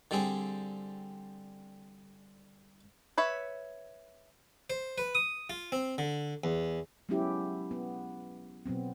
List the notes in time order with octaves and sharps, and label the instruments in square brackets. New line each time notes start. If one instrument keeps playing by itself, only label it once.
[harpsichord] D3 G3 C4 G#4
[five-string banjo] B4 C#5 E5
[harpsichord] C5
B4
D#6
F4
C4
D3
E2
[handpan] F#3 G#3 B3 C#4 E4 G4
B3
B2 F#3 B3 C4